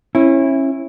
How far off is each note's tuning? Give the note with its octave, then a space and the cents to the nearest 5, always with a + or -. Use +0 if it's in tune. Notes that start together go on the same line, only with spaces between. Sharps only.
C#4 -30 E4 +0